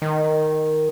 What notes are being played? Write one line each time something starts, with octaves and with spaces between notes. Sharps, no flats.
D#3